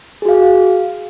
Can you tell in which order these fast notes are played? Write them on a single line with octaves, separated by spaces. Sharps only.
G#4 F#4 F5